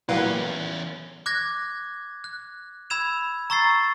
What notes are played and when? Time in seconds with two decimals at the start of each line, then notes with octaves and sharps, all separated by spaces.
0.09 E2 A#2 F#3 G3 C#4 E4 B4 F5
1.26 D6 F#6 G#6 A#6
2.24 F#6
2.90 B5 E6 G#6 E7 F7
3.50 A#5 C#6 E6 A6 C7